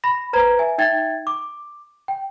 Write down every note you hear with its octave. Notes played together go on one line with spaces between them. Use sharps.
B5 A#6
B4 C5 A#5 G#6
E5 G#5
D#4 E5 G5 G#6 A6
D6
G5